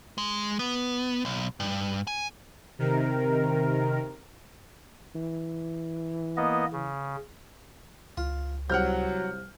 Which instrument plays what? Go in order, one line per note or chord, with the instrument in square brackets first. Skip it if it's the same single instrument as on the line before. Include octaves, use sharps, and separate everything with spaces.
[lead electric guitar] G#3
B3
B1
G2
G#5
[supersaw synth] C3 D#3 A#4
[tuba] E3
[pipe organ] A#3 B3 D#5
C#3
[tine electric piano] C#2 [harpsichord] F4
[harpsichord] C2 [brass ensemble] F#3 [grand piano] F#5 F6 G6